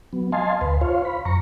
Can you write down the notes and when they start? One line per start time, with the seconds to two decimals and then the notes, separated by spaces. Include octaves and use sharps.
0.13 F#3 B3
0.32 D#5 F5 G#5 A5 C6
0.61 D2 B4
0.81 F4 C5 C#5 F5
1.05 B5
1.25 F#2 A#5 C#6